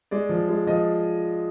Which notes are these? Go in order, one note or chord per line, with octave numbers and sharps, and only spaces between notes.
G#3 D5
F3
G#3
F3 D#5